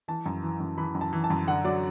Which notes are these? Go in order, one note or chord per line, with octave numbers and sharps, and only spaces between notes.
E3 A5
F#2
E3
F#2
E3 B5
F#2
A5
E3
A5
F#2
D3 F#5
F#3 D5